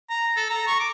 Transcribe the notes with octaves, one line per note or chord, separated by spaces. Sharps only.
A#5
A4
A#5
C#6
D6